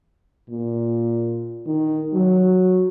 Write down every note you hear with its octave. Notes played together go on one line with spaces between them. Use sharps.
A#2
D#3
F#3